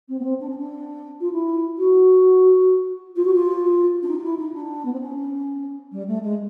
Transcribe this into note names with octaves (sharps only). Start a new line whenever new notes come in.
C4
B3
C4
D4
C#4
D4
F4
E4
F#4
F4
F#4
F4
D4
D#4
F4
E4
D#4
D4
B3
C4
C#4
G3
A3
G#3